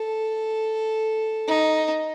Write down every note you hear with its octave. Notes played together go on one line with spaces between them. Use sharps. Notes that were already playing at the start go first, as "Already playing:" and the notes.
Already playing: A4
D#4